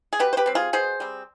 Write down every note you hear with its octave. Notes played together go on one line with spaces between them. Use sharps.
G#4
B2 G4 B4
C5
G4 B4
G3 C4
F4 G#4
B2 G#4 C5
G3 C4